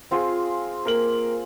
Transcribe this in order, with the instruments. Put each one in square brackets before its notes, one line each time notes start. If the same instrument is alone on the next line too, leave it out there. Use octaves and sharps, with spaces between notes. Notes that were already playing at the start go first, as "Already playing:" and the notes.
[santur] C4 F4 G#4
[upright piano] A#3 A#4 F#7